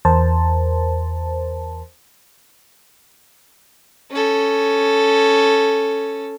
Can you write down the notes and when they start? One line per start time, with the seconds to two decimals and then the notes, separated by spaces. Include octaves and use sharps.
0.05 E2 A#4 C5 A5
4.11 C#4 A4